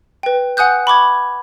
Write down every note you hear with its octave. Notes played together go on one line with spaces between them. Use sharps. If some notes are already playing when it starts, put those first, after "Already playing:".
B4 G5
F#5 G#5 D#6 F#6 G6
B5 C#6 D6 G#6